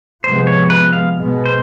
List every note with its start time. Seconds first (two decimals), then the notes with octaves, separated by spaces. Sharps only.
0.24 C3 F3 G#3 B3 C5
0.47 C#5
0.70 B4
0.93 F5
1.16 B2 G#3 B3
1.46 C5